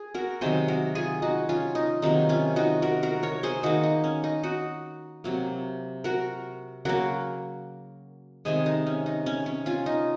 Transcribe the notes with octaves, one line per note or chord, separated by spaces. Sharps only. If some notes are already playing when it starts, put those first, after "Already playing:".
Already playing: G#4
F#4 A#4
C3 D#3 F#3 G#4 C5
F#4 A#4
F4 G#4
D#4 F#4
C#4 F4
D#4
C3 D#3 F#3 A#3 D#4
C#4 F4
D#4 F#4
F#4 A#4
F#4 A#4
A#4 C#5
G#4 C5
D#3 A#3 D#4 F#4
D#4
C#4
D#4
D#4 F#4
C3 F#3 A#3
F#4 A#4
C#3 F#3 A#3 F#4 A#4
C3 D#3 G#3 G#4 C5
D#4
C#4
D#4
C#4
C#4
C#4 F4
D#4